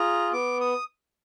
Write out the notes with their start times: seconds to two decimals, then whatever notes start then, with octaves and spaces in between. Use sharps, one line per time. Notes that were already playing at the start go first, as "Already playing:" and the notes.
Already playing: F4 G#4 A#5
0.33 B3 D6
0.61 D#6